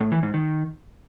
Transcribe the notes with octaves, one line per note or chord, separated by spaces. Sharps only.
A2
E3
G#2
D#3